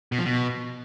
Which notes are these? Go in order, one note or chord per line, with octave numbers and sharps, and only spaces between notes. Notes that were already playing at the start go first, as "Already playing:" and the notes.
B2
F3
B2